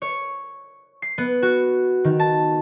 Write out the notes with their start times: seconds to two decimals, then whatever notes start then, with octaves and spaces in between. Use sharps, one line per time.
0.02 C#5
1.02 C7
1.18 B3
1.42 F#4
2.04 D#3
2.20 A5